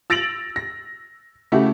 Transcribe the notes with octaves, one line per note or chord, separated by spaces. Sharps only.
E6 A6 A#6 D7 F7 F#7
A#6
C#3 A3 E4 F#4 G4